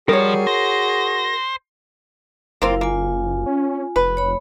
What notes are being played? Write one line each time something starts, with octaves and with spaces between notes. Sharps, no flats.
F3 G3 F#4 G#4 A#4 C#5
C5 A#6
F#1 A#3 C4 E4 F4 A#4 F5
A#3 F4 G#5
C#4
F1 B4
C#5 B5